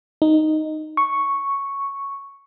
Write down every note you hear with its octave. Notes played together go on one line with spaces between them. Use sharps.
D#4
C#6